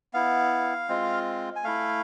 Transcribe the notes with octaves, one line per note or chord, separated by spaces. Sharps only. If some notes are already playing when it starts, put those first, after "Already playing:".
B3 E4 F5
G#3 C4 F4
G#5
A3 E4 F5